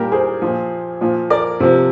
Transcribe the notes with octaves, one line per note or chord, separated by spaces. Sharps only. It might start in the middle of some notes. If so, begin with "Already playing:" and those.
Already playing: A#2 G3 G4 A#4
G#4 C5
A#2 F3
A#2 F3
A#4 D5
C3 F3